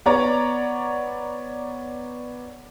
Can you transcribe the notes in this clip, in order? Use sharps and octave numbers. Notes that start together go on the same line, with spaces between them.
B3 C#5 D5 A#5